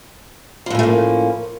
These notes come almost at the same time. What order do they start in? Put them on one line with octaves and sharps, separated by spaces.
F3 A2 C#4 A3 A#3